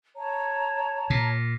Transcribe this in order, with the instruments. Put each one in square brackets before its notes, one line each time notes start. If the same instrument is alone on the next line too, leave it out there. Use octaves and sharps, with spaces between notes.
[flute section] C#5 A5 A#5
[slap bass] A#2